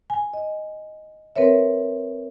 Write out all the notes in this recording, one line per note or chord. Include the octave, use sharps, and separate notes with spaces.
G#5
D#5
C4 A#4 B4 C#5 E5